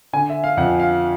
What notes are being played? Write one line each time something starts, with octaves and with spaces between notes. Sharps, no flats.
D3 G#5
E5
F5
F2 F#5
F5